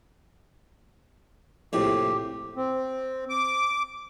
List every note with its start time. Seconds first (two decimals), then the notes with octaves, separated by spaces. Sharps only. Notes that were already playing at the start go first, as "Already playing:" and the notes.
1.73 A#1 A2 C3 G4
2.56 C4
3.29 D6